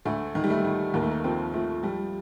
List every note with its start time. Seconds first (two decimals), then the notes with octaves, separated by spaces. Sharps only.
0.05 D2 A3
0.35 D#3
0.44 G3
0.50 A3
0.65 D#3
0.94 D#2 A#3
1.03 A3
1.11 A#3
1.24 F3 C4
1.53 F3 A3
1.83 F3 G3